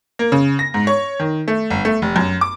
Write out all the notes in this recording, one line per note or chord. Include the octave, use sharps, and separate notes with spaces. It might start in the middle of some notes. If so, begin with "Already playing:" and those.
A#3
C#3
A#6
G#2
C#5
D#3
A3
G1
A3
F1
F#2
D6